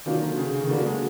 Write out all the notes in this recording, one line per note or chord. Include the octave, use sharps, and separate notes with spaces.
D#3 F#3 A#3 D4 F4
D3
C#3
C#3
D#3
D3 F#3 A#3 D4 F#4
G#3